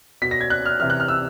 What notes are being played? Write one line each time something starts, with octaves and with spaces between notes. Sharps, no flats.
B2 B6
A#6
G#6
F#6
F6
C3 E3 F6
F#6
F6
E6